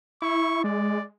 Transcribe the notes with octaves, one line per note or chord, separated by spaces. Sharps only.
E4 C#6
G#3 D5